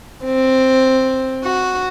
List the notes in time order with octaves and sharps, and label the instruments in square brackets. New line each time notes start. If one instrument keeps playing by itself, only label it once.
[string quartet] C4
F#4